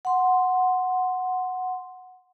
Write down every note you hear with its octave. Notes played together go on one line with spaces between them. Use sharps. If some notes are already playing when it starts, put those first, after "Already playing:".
F#5 C6